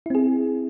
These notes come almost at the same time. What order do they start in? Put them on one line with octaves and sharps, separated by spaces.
E4 C4 G#4